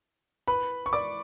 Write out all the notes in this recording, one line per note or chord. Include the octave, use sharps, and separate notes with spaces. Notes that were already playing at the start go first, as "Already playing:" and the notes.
B4 B5
C#6
D5 D6